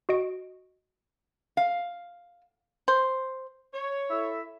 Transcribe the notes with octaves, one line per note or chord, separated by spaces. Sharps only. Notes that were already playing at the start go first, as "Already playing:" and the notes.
F#4 D#5 D7
F5
C5
C#5
E4 A4 E5